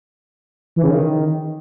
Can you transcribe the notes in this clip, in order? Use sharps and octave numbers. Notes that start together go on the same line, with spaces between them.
E3
C#3
D#3